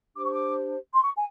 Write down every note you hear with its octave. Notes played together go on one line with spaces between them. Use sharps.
D4 G4 C5 D6
C#6
D6
C6
C#6
G#5